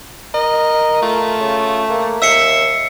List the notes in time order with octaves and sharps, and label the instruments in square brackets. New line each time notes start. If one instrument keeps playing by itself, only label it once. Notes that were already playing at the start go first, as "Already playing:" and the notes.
[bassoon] A#4 [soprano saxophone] D#5
[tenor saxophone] A3 [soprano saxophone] F4
[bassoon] C#3
A#3
[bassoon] D#2 [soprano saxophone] E5 [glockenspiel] E6 C7 C#7